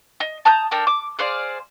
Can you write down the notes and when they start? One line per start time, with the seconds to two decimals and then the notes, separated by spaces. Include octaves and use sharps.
0.20 D#5
0.45 A5 A#5 D#6 G6
0.71 D4 A4 A#4 G5
0.87 D6
1.19 G#4 C5 D5 F5